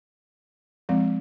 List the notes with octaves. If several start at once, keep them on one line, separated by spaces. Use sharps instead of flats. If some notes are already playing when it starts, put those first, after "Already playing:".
F3 G#3 C4